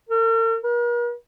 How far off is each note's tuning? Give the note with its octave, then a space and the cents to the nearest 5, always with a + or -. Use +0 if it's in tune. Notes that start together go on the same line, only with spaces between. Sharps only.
A#4 -45
A#4 +45